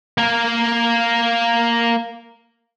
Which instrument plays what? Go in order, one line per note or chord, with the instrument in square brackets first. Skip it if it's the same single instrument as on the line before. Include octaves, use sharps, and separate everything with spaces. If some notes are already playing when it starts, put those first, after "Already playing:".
[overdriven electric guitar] A#3 A#4